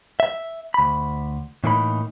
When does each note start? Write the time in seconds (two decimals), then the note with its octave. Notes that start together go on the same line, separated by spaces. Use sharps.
0.20 E5
0.74 D2 B5
1.64 A2 E3 A#3 D#4 B5